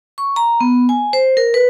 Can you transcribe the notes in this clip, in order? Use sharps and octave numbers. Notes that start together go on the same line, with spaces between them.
C#6
A#5
B3
G#5
C5
A#4
B4